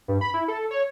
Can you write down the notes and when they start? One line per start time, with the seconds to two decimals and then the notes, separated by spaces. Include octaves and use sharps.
0.08 G2
0.21 B5
0.34 E4
0.48 A4
0.71 C#5